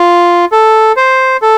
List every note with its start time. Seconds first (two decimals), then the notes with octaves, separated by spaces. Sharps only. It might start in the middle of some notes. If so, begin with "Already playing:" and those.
Already playing: F4
0.52 A4
0.97 C5
1.42 A4